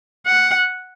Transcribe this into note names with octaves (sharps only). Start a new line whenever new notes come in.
F#5